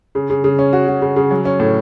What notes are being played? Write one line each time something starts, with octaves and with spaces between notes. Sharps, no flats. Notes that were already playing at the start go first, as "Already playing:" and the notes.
C#3
C#3
C#3
C#4
F#4
F#4
C#3
C#3
F#3
C#4
A2